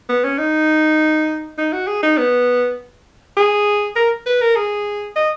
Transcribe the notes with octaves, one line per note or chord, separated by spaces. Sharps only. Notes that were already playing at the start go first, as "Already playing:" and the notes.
B3
C#4
D#4
D#4
F#4
G#4
D#4
B3
G#4
A#4
B4
A#4
G#4
D#5